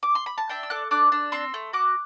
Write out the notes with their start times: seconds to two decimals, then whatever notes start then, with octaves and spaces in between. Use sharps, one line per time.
0.03 D6
0.15 C6
0.26 B5
0.38 A5
0.49 D4 E5 G5
0.63 E6
0.70 A4 D6 F#6
0.91 D4 D6 F#6
1.12 D4
1.32 C4 C6 E6
1.54 A3
1.73 F#4 D6 F#6